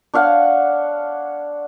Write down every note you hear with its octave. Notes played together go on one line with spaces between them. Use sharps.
D4 C#5 F5 F#5